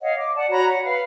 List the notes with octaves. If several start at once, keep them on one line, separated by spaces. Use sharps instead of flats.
C#5 D#5 F5 F#5
D6
D5 F#5 A5
F#4 C#5 A#5 B5
F#5
B4 F5 B5